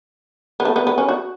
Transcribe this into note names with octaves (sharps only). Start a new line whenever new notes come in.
B3
A3
B3
B3
C#4
F#4